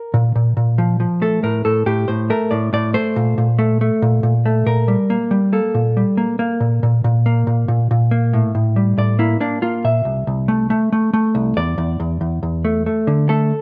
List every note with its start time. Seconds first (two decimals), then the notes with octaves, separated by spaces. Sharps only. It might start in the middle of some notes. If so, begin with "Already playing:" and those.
Already playing: A#4
0.14 A#2
0.35 A#2
0.57 A#2
0.78 F3
1.00 F3
1.22 A3 A4
1.43 A2 A#4
1.65 A2 A4
1.86 A2 G4
2.08 A2 C5
2.30 A3 A#4
2.51 A2 D5
2.73 A2 D5
2.94 A3 C5
3.16 A#2
3.38 A#2
3.59 A3
3.81 A3
4.02 A#2
4.23 A#2
4.46 A3
4.66 A#2 A#4
4.88 G3
5.10 A#3
5.31 G3
5.53 A#3 A4
5.75 A#2
5.97 G3
6.17 A#3
6.39 A#3
6.60 A#2
6.83 A#2
7.04 A#2
7.26 A#3
7.47 A#2
7.68 A#2
7.91 A#2
8.11 A#3
8.33 A2
8.55 A2
8.76 G3
8.98 A2 D5
9.19 A#3 E4
9.40 A#3 D4
9.62 A#3 F4
9.84 A#2 E5
10.05 C2
10.27 C2
10.48 A3
10.70 A3
10.92 A3
11.13 A3
11.35 C2
11.57 E2 D5
11.78 E2
12.00 E2
12.21 E2
12.43 E2
12.65 A3
12.86 A3
13.07 D3
13.29 A3 A4